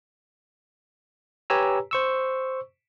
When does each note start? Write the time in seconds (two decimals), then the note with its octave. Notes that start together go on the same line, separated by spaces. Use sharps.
1.50 G4 B4 C#5 G#5 A#5 E6
1.91 C5 C#6 E6